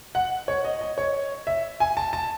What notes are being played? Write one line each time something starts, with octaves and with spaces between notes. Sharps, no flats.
F#5
C#5
D#5
D#5
C#5
E5
G#5
A5
A5